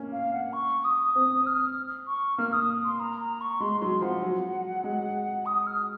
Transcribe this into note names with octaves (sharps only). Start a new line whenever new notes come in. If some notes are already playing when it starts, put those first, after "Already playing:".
Already playing: A#3 C#4
F5
F#5
C#6
D#6
C4 D#6
F6
C#6
A#3 F6
D#6
C6
A#5
A#5
C#6
G#3 C6
F#3 C6
F3 F#5
F#3
G#3
D#6
F6